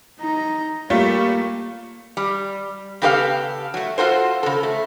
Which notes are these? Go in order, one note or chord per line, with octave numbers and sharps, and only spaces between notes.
D#4 A#5
G3 A3 A#3 F4
G3
C#3 B3 G4 A4 C5 F5
F#3 A3
F4 F#4 A4 C5
C#3 A4
A3